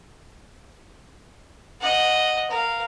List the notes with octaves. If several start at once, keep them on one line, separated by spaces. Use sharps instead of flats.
D#5 F#5
A#4 F5